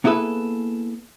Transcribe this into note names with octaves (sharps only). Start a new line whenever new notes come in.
A#3 B3 E4 G#4 A4 B4